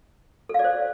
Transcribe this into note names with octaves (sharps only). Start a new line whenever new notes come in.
A4 C5 D5 F5